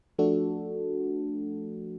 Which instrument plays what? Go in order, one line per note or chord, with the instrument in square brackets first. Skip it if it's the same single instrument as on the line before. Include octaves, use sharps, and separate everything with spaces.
[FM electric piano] F3 A3 D4 F#4 A4